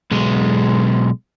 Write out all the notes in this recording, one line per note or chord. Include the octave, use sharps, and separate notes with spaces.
B1 G#3